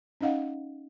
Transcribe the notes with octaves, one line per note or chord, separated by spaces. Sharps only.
C#4 D#4 D#5 F5 F#5